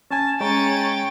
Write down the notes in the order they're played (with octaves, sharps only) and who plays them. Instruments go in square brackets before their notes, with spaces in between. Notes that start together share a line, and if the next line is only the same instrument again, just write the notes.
[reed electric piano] C#4 G#5 [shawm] A5
[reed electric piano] G#3 C#5 A#5 [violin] C#4 A6 [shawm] G5